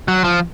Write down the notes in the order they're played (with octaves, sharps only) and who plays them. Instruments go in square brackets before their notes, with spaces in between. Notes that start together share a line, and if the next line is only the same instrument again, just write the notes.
[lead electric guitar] F#3
F3